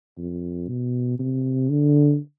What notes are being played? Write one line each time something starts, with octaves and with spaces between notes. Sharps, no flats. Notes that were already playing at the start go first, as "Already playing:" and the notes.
F2
B2
C3
D3